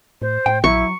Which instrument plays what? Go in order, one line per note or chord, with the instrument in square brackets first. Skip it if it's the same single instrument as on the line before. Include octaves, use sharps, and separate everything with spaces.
[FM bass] A2 [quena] C5
[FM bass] A2 [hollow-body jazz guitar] G5
[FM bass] A#1 [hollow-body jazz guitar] F#3 [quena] E4 [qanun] C#6